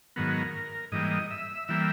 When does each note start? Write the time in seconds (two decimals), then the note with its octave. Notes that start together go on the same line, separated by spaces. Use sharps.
0.16 G#2 D#3 F#3 B3 A#4
0.92 G#2 E3 G3 A#3 D#5
1.31 E5
1.68 E3 G3 A#3 E5